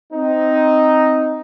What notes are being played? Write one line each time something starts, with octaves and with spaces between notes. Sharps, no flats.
C4 D#4